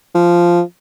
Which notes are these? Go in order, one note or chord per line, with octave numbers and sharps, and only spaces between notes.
F3